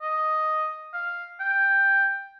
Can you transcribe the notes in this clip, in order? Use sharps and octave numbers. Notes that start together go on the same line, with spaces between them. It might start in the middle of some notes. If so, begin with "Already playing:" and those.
D#5
F5
G5